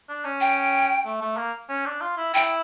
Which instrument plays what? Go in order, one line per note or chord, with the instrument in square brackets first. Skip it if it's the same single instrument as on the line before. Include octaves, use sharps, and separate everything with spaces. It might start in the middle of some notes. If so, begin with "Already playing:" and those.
[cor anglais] D4
C#4
[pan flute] G5
[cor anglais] A3
A3
A#3
C#4
D4
F4
E4
[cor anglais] E4 [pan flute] G5